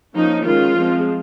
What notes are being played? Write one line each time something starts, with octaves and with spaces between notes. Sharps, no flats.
F3 A#3 C#4 D#4
D#3 G#3 C#4 F4
F3 G#3 C4